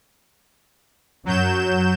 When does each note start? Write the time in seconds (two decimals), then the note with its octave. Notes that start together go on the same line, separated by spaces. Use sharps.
1.26 F#2 F#3 G6 E7